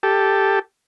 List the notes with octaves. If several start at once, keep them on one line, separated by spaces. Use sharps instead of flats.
G4 A4